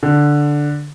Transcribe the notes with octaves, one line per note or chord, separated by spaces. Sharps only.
D3